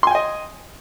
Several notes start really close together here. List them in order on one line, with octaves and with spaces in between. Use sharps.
C6 G#5 G5 D#5